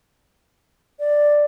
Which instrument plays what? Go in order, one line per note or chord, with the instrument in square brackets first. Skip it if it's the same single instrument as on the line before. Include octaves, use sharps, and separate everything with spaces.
[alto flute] D5